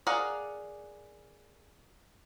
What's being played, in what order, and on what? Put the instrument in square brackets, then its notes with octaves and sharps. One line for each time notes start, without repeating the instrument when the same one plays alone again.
[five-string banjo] G#4 A#4 D5 F5 F#5